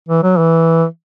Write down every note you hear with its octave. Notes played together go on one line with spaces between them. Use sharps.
E3
F#3
E3